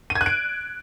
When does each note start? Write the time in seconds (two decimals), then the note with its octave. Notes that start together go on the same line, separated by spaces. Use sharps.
0.10 D#7
0.15 G#6
0.21 F#6
0.26 D7